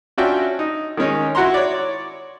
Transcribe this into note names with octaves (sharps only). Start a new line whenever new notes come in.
C#4 D4 F4 F#4 E5 G5
D#4
D#3 G#3 C#4 D#4
E4 F#4 F#5 A#5 C6
C#5 D5